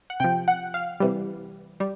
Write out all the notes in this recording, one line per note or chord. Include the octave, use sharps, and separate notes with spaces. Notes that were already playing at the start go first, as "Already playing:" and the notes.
F#5
C3 F3 G5
F#5
F5
C3 E3 G3
G3